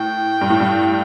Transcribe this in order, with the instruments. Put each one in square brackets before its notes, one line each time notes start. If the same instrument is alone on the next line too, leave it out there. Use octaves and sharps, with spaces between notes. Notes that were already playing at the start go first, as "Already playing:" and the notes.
Already playing: [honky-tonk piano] A2 [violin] G5
[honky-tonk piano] G2
A2
G2